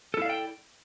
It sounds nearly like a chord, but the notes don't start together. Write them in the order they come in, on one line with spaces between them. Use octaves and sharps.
A4 E4 F5 D5 G5